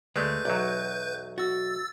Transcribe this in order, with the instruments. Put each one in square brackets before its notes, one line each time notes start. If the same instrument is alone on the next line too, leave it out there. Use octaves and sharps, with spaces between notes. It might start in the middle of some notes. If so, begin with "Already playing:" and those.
[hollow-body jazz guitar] D2 D5 [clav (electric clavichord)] G#3 A3 [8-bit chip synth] B4 G6
[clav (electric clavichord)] B1 E2 F#3 [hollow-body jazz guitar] D5
[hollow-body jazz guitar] F#4 [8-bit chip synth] E6 A6